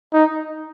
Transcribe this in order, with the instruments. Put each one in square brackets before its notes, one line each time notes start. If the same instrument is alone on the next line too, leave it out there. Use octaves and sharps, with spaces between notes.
[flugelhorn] D#4